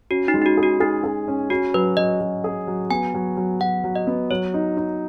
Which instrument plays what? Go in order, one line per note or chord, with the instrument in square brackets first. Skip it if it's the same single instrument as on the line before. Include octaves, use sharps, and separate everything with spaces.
[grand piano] C#4 [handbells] F#4
[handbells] D#4
[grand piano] G#3
[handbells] D#4
F#4
[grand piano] G#4
[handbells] F#4
[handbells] D#4 [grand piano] G#4
[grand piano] G#4
C#4
[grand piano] C#4 [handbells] F#4
[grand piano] F#3 [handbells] B4
[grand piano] F#3 [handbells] D#5
[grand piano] F#3
G#4
F#3
[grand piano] B3 [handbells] G#5
[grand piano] F#3
F#3
[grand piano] F#3 [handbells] F#5
[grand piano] F#3
[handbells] D#5
[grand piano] B3
[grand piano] F#3 [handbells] C#5
[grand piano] D#4
D#4